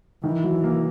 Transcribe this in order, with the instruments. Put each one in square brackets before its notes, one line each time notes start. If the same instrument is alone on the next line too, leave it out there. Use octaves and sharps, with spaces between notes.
[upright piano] D#3 [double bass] E3
[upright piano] F#3
A#3